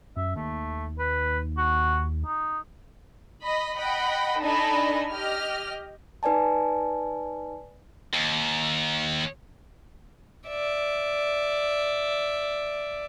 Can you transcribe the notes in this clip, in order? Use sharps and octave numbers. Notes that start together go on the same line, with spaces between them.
F#2 E5
D#2 A3
B4
F#4
D#4
D#5 B5
D#5 F#5 G5 B5
D4 D#4 A4 D#5 G#5 B5
G4 D#5 F6
D#4 B4 D5 G#5 A5
D#2
D5 E5